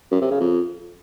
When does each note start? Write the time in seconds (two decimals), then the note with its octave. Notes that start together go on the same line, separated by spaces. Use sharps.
0.12 F#2
0.21 C3
0.31 C#3
0.40 F2